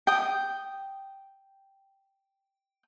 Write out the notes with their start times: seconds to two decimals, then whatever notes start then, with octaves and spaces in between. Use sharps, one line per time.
0.07 G5 D#6